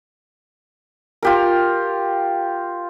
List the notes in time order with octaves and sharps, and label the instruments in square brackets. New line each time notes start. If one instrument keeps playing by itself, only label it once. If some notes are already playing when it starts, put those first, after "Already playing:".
[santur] F4 G4 A#4